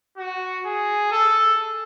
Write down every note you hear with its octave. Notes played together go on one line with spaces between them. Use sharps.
F#4
G#4
A4